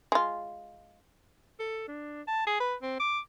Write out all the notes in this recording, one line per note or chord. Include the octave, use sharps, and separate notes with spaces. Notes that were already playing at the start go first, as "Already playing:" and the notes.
G#3 F4
A4
D4
A5
G#4
B4
C4
D6